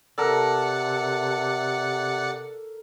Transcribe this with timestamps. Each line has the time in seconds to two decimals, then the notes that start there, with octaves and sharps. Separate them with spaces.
0.18 C3 A4 A#4 D5 F#5 C#7